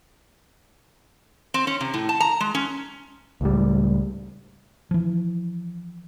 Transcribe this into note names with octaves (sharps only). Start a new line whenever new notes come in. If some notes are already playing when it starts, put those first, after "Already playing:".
C4
C#4
C3
A2
A5
A#5
G#3
C#4
C#2 A2 G3
E3 F3